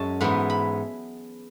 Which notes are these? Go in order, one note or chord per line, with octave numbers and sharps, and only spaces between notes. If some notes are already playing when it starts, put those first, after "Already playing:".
Already playing: F#2 G#3 C#4 E5 A5
G#2 E3 B3 B5
B5